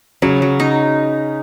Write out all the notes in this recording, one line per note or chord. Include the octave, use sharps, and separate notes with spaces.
C#3 F#3 C#4
F#3
D#4